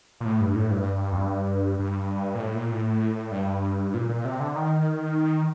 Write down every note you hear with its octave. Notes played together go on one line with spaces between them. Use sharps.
A#2
A2
G2
A2
G2
F2
G2
G2
A#2
A2
A#2
A2
G2
A#2
A#2
C3
D3
D#3